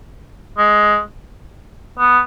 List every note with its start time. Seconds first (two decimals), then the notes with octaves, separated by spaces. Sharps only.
0.58 G#3
1.99 B3